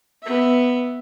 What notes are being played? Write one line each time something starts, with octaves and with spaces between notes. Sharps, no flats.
B3 E5